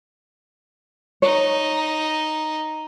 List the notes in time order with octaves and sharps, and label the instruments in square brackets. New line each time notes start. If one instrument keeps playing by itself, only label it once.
[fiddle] D#4 [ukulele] C#5